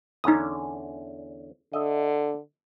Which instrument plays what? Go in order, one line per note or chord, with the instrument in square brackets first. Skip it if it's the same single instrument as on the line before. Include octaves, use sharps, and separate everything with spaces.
[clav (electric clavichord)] E2 D3 C#4 [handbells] D#4 D#6
[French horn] D3 [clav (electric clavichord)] D#5 E5